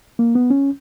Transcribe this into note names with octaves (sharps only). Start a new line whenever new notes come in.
A#3
B3
C#4